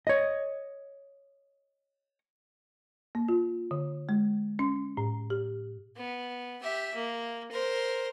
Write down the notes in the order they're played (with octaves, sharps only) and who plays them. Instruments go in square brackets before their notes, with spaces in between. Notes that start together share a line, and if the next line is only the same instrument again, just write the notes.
[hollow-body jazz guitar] C#5 D#5
[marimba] A#3
F4
D3
G#3
C#4
A2
G4
[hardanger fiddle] B3
G4 E5
A#3
A#4 C5